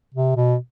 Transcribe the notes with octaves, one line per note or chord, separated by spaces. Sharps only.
C3
B2